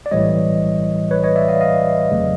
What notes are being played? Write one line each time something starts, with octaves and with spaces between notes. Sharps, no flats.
D5
B1 A2 E3 G3 C#5 D#5
B4 C#5
C#5 D#5
D5 E5
D#5 F5
D#5 F5
G1 F2 C#3 F#3 A3